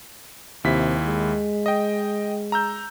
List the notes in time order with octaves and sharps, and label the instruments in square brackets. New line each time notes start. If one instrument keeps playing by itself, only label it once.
[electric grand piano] D#2 E4 B6 [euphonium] C3
[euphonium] G#3
[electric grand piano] D#5 G5
A#5 E6 G6